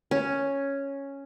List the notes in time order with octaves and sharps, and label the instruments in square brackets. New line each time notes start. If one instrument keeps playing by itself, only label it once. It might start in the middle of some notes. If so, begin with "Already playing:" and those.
[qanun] C#4